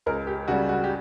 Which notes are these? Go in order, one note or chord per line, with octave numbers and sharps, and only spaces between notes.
C#2 A#4
G4
C#3 G3 F#4
F#4
G4